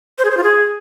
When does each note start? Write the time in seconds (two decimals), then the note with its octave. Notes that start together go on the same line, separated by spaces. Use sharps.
0.18 C5
0.25 G#4
0.31 C5
0.37 F4
0.43 G#4